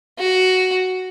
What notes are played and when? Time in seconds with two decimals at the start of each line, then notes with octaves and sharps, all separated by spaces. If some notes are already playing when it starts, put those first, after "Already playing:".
0.19 F#4